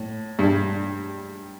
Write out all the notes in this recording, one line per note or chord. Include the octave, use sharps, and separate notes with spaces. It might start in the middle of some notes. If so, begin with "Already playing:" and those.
Already playing: A2
G2